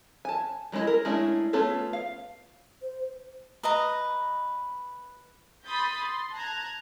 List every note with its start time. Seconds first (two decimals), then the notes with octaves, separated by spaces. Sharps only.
0.25 G#5 A5
0.72 G3 G#3 D4 E4 D#5
0.87 A#4
1.05 G#3 A3 C#4 D4 E4
1.53 A3 B3 C#4 F4 A4
1.93 F5
2.82 C5
3.63 B4 D#5 A#5
5.64 B5 C6 D#6 G6 A6 B6
5.97 C6
6.34 A5 A#5 F#6 G#6